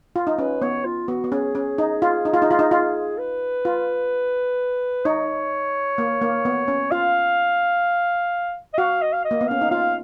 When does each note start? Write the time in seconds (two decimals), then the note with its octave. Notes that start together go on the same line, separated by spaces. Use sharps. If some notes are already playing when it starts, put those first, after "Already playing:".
0.16 F4
0.27 D#4
0.38 C#4 B4
0.62 B3 C#5
0.85 F4
1.08 B3 F#4
1.24 B3
1.32 C#4 G#4
1.55 C#4
1.78 D#4
2.02 F4
2.25 D#4
2.34 F4
2.42 D#4
2.51 F4
2.59 D#4
2.71 F4
3.18 B4
3.65 F4
5.05 D#4 C#5
5.98 A#3
6.22 A#3
6.45 B3
6.68 C#4
6.91 F4 F5
8.74 D#5
8.78 F#4 F5
9.02 D#5
9.13 F5
9.25 D#5
9.31 A#3
9.41 B3
9.48 C#4 F5
9.61 D#4
9.71 F4 F5